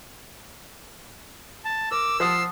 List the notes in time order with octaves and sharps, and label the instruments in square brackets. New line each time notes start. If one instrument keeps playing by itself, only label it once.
[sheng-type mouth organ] A5
[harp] A#4 [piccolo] D6 [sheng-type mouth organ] E6
[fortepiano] F3 [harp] F#5 A5 D#6 [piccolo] C7